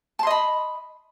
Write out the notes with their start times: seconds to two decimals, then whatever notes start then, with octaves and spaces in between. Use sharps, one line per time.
0.19 A5
0.23 C6
0.27 D#5
0.31 B5